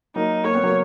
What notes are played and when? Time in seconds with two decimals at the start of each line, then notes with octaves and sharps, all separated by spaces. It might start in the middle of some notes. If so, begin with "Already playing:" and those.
0.16 F#3 A#3 D#4
0.45 A#3 C#5
0.55 B3
0.63 F#3 A#3